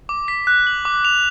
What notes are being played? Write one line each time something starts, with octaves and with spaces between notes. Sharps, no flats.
D6
B6
F#6
F#7
D6
F7